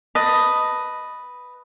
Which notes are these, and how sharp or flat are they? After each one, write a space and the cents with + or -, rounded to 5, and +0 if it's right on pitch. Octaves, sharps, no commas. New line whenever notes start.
B4 +0 D#5 +0 A5 +10